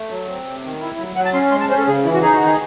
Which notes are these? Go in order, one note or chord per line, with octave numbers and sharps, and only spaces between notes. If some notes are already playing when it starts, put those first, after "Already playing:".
Already playing: A3
F#3
C4
C3
D#3
E4
F#3
F#3 F#5
A5
C#4 C6
G#3 C6
A5
C#4 C5
A4
C#3 G#4
E3 E4
F#4
D#4 G#4
F#4
D#3
G#4